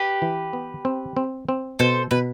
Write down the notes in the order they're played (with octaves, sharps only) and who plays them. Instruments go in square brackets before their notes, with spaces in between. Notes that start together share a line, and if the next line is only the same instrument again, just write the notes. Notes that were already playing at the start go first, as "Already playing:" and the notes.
Already playing: [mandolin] G4 B4
[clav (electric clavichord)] E3
B3
C4
C4
C4
[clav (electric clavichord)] B2 [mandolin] A4 C5
[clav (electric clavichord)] B2 [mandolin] B4